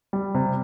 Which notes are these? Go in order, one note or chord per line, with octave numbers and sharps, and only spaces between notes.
G3
C3